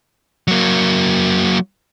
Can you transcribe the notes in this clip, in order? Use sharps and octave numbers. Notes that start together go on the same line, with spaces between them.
F#3 A#3